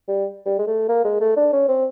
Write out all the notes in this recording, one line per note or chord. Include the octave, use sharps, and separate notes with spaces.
G3
G3
G#3
A3
A#3
G#3
A3
D4
C#4
C4